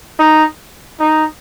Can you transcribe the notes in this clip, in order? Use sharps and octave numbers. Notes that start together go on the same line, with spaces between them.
D#4
D#4